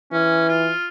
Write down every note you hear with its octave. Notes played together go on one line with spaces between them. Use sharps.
E3 C#4
F4